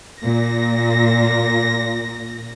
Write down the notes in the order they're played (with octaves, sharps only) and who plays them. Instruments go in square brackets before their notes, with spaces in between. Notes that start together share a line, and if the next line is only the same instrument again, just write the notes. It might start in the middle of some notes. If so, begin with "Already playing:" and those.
[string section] A#2 A#6